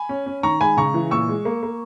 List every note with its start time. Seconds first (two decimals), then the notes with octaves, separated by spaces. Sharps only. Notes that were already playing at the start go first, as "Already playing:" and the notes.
Already playing: G#5 B5
0.09 C#4
0.26 C#4
0.43 D#3 A#5 C#6
0.61 G#3 G#5 B5
0.77 C#3 A#5 C#6
0.94 E3
1.11 A#2 C#6 E6
1.28 G#3
1.45 A#3
1.63 A#3